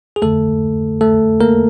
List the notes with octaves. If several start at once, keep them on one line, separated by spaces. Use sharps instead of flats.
G#4
F2 D3 A3 A4
A3 A4
A#3 A#4